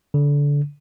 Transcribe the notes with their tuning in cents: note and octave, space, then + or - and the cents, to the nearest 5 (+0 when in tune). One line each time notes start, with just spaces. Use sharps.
D3 -25